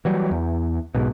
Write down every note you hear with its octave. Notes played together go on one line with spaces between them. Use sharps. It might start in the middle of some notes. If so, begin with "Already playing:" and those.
E3 F#3 G3
E2
B1 G#2 B2